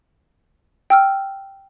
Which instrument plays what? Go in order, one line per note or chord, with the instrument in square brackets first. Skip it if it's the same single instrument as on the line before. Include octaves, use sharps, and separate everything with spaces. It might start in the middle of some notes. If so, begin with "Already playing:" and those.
[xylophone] G5 E6 F6